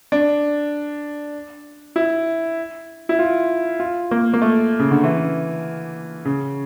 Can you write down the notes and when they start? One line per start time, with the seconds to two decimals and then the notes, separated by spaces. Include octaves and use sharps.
0.12 D4
1.96 E4
3.09 E4
3.19 F4
3.80 F4
4.11 A#3
4.33 A#3
4.42 A3
4.79 C#3
4.91 D3
5.04 E3
6.25 C#3